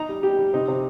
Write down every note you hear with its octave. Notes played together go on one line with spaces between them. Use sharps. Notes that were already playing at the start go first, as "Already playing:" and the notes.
Already playing: D#4 A#5
G3
G3 G4
G3
C3 D#4
C3